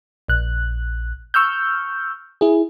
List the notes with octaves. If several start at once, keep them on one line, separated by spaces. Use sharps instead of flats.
A#1 F#6
C#6 E6 F6 G6
E4 G#4